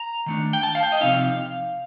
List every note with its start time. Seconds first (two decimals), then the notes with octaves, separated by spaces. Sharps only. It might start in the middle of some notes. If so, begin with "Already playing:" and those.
Already playing: A#5
0.26 D#3 A3 D4
0.53 G5
0.63 A5
0.75 F5
0.83 G5
0.92 D#5
1.01 C3 F3 C4 D#4 F5